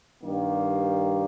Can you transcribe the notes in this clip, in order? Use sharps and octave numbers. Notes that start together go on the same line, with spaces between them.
G2 D#3 G3 A#3